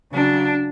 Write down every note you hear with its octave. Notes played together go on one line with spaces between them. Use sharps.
C#3 F#3 D4